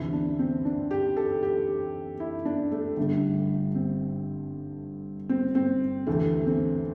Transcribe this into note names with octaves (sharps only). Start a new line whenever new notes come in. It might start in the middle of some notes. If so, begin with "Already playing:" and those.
Already playing: D2 C3 E3 E4
D4
C4
D4
G4
A4
G4
E4
D4
A3
G1 G2 D3 A3
C4
C4
C4
D2 C3 E3 A3
C4